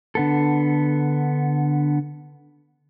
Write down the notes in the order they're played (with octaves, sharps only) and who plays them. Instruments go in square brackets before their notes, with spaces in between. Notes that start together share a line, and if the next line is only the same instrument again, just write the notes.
[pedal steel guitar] D3 B3 A4